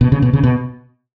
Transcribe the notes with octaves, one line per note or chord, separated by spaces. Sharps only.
B2
C#3
B2
C#3
B2